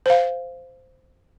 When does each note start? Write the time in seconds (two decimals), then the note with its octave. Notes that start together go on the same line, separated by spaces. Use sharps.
0.06 C5 F5